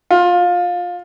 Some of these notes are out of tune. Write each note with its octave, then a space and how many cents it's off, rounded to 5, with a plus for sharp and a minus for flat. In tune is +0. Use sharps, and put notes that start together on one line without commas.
F4 +20